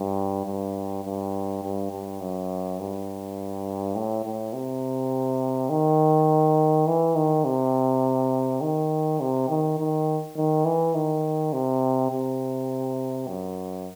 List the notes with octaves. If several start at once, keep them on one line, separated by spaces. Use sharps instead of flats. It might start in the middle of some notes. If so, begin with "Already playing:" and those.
Already playing: G2
G2
G2
G2
G2
F#2
G2
A2
A2
C3
D#3
E3
D#3
C3
D#3
C3
D#3
D#3
D#3
E3
D#3
C3
C3
F#2